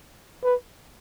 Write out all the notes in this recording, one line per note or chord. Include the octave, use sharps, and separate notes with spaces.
B4